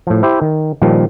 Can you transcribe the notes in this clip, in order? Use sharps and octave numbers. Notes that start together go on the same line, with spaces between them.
A2 F3
E4 G4 C5
D#3
A#2 D#3 F3 G3